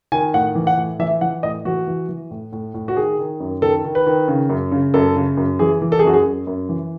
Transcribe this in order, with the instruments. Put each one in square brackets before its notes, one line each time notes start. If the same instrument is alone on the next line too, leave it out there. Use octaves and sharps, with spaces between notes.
[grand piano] D#3 G#5
A2 F#5
E3
F#5
A2
E3 E5
E3 F#5
A2 D#5
E3 F#4
E3
E3
A2
A2
A2
F#4
D#3 G#4
D#3
F#2
D#3 A4
D#3
B4
D#3
C#3
F#2
C#3
F#2 A4
C#3
F#2
E3 G#4
E3
A4
G#4
F#2 F#4
G#4
F#2
F#2
E3